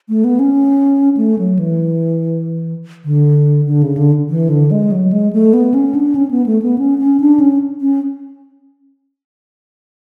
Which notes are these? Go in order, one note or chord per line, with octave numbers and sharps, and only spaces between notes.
A3
B3
C#4
A3
F#3
E3
D3
D3
C#3
D3
E3
D3
G#3
F#3
G#3
A3
B3
C#4
D4
C#4
B3
A3
B3
C#4
C#4
D4
C#4
C#4